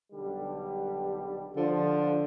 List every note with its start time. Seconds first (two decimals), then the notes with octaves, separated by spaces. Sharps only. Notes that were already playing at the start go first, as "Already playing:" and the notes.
0.12 B1 D3 G3
1.56 D3 F3